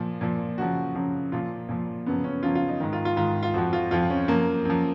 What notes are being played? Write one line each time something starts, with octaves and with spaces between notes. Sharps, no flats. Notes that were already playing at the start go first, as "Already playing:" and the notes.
Already playing: A#2 F3
A#2 F3
F#2 C#3 F3 F#4
F#2 C#3 F3
A#2 F3 F4
A#2 F3
F#2 C#3 F3 B3
C#4
F#2 C#3 F3 F4
F4
D#4
G#2 D#3 D#4
F4
F4
G#2 D#3 F4
F4
F2 F3 F#4
F4
F2 F3 F4
C#4
F#2 F3 A#3
F#2 F3